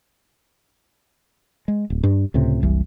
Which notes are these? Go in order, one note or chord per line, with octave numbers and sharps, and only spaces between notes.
G#3
D1
G2
C#2 A2 C3
F#1 C2 E3